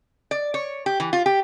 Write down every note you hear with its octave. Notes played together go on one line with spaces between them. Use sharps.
D5
C#5
G4
E3
F4
G4